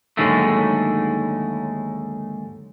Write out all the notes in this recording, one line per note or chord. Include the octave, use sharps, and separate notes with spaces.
D#2 G#2 D3 F#3 G#3 A3